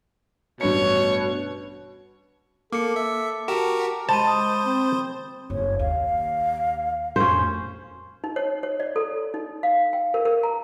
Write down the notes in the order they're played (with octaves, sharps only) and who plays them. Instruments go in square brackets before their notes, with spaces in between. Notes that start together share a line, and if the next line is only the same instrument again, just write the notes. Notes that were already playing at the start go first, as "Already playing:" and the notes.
[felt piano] A1 G2 C#7 [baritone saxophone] B2 [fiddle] C#5
[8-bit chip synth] A#3 [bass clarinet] A4 [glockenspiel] D6 C#7
[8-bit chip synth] E5
[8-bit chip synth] F#4 G4 A#4 [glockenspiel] A5 E7
[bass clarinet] G#3 [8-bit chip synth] C5 [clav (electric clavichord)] A5 [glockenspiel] B5 A6 D#7
[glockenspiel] D#6
[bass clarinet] C4
[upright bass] F#1 [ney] C#5
[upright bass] D#2 [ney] F5
[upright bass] F2 A2 [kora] C#4 C5
[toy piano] D#4
C#5
C#5
D5
A4
D#4
F5
G5
A#4
A#4
A#5